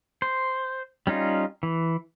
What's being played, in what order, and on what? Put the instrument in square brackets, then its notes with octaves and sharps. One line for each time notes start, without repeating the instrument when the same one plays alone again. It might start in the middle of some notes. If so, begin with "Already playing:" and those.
[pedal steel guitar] C5
G3 C#4 D#4 F4
E3